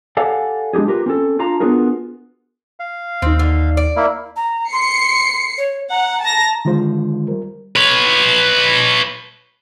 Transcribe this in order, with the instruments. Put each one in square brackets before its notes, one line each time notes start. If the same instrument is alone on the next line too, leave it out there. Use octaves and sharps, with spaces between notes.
[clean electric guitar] G4 A4 D5 F5 F#5 G#5
G#3 D4 D#4 G4 G#4
F4 G4 A#4 B4
C4 C#4 A4
D4 F4 F5 A5 A#5
B3 D4 F4 F#4 G#4 A#4
[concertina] F5
[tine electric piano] D#2 D#4 [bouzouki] C4
[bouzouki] D3
D5
[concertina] A#3 E4
[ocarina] A#5
[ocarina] C6 [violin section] C7 C#7
[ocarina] C#5
[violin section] F#5 [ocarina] A#5
[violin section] A5 A#6 [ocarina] A#5
[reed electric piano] D3 D#3 G#3 F4 C5
G3 A#4
[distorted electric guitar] B4 C#5